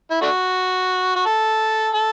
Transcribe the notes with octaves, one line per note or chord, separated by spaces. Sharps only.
E4
A3 D4 F#4
F#4
A4
A4